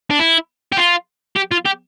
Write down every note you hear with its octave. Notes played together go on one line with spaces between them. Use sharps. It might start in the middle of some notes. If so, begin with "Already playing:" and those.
D4
E4
G4
F4
G4
F4
G4